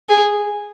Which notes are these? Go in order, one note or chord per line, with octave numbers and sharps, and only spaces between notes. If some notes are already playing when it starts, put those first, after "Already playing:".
G#4